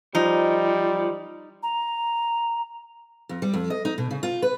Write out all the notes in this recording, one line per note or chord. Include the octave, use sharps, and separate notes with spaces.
F3 G3 D#4
A#5
F2
G3
F2
D#5
D#4
B2
C#3
F4
B4